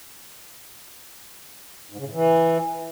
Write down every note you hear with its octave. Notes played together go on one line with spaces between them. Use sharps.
G#2
C#3
A2
E3